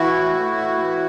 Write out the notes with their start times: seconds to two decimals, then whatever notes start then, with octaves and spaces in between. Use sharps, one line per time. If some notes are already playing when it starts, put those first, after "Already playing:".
Already playing: E3 E4 F#4
0.14 A2
0.35 A3
0.58 A2
0.80 E3